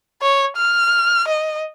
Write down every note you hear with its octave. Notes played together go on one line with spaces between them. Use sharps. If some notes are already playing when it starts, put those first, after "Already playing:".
C#5
F6
D#5